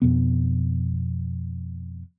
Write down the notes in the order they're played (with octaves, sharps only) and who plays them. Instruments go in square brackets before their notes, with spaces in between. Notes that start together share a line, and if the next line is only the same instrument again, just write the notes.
[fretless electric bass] F2 B2 B3